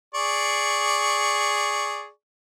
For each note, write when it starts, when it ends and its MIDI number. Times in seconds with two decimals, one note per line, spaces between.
0.15 2.09 68
0.15 2.09 74
0.15 2.09 85